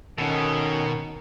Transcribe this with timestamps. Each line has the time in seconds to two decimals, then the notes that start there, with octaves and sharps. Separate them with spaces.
0.18 B2 D#3 C#4 A4